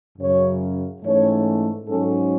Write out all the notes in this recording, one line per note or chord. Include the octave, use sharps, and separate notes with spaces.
F#2 C#3 F#3 C#5
G#2 E3 A3 C#4 C#5
G#2 F#3 C#4 A4